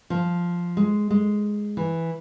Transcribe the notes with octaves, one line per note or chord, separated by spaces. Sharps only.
F3
G#3
G#3
E3